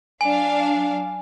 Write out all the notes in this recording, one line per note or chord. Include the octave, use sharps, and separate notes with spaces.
F#3 D4 F5 G#5